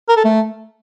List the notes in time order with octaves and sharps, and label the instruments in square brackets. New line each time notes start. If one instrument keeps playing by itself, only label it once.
[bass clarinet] A#4
A4
A3